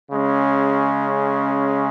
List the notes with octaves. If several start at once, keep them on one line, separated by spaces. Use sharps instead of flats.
C#3 G#3 C#4